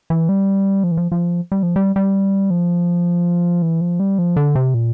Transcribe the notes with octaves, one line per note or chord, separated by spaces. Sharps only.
E3
G3
F3
E3
F3
F3
G3
F3
G3
G3
F3
E3
F3
G3
F3
D3
C3
A#2